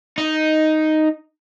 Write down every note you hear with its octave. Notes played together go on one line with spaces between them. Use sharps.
D#4